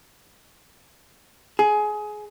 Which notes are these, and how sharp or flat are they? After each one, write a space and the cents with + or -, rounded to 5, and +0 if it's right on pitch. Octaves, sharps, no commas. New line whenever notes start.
G#4 +20